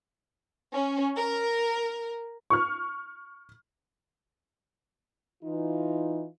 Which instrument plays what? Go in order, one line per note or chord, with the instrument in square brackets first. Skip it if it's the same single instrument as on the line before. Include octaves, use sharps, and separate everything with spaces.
[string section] C#4
A#4
[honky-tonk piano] C#6 F6
[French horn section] E3 D#4 F4